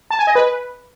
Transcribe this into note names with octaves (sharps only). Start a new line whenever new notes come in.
A5
G#5
D#5
B4